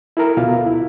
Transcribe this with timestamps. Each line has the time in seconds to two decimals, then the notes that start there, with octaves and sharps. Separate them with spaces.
0.17 E4 A4 A#4
0.37 D2 B2 F4 F5
0.66 E4